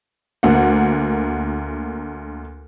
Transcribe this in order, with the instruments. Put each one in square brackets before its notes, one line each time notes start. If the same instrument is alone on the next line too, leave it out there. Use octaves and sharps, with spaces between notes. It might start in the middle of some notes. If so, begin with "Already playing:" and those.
[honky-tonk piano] D2 A#3 F#5